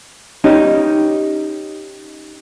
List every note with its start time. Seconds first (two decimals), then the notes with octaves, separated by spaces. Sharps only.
0.44 C#4 D#4 G4